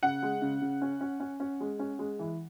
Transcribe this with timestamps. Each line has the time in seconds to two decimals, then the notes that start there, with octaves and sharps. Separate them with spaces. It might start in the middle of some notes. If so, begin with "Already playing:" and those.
0.03 C#3 F#5
0.23 G#3
0.42 C#3
0.61 C#3
0.81 C#4
1.01 C#4
1.20 C#4
1.40 C#4
1.60 G#3
1.79 C#4
1.99 G#3
2.19 E3